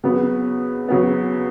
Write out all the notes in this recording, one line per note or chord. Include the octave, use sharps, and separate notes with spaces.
C#3 F#3 B3
C#3 F#3 B3